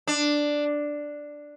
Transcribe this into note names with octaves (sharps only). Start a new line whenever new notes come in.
D4